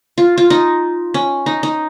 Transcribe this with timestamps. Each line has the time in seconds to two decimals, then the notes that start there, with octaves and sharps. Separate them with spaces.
0.18 F4
0.38 F4
0.50 D#4
1.14 C#4
1.46 D#4
1.63 D#4